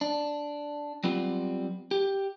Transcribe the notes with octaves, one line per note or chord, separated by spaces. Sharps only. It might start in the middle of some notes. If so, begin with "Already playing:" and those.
D4
F#3 G3 B3 C4 F4
G4